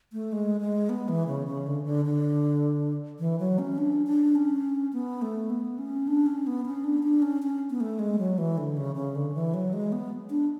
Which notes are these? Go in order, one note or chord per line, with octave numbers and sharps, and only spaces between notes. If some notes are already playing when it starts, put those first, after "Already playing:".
A3
G#3
G#3
B3
E3
C#3
C#3
D3
D3
D3
E3
F#3
C#4
D4
D4
C#4
B3
A3
B3
C#4
D4
C#4
B3
C#4
D4
D4
C#4
C#4
B3
A3
G#3
F#3
E3
D3
C#3
C#3
D3
E3
F#3
G#3
B3
D4